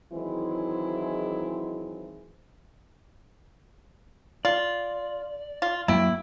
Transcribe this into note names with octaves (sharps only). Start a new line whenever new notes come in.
D#3 E3 F#3 G#3 C4 E4
F4 D5
F4
F#2 A#3 E4 G5